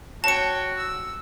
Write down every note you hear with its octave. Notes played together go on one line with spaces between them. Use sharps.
F#4 C#5 G5 A5 C#7
E6